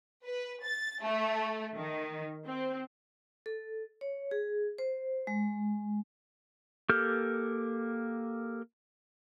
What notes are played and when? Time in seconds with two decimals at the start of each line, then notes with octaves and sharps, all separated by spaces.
0.24 B4
0.63 A6
1.02 A3
1.74 D#3
2.46 C4
3.46 A4
4.01 C#5
4.31 G#4
4.78 C5
5.27 G#3
6.89 A#3 G4 A4 F6 G6